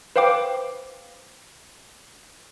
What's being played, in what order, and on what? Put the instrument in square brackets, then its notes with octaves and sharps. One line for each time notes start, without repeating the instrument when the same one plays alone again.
[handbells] B4 C5 F5 G5 D6